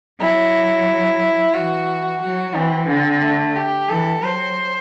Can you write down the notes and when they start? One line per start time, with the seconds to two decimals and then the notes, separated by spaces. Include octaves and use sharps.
0.20 F#3 E4
1.54 E3 F#4
2.22 F#3 F#4
2.55 E3 C4
2.89 D3 C4
3.22 A3
3.56 G4
3.89 E3 A4
4.23 F#3 C5